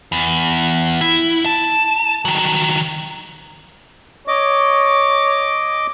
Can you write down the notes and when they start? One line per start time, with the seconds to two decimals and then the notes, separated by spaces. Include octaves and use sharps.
0.12 E2
1.01 E4
1.46 A5
2.25 D#3 F#3
4.28 C#5 D#5 D6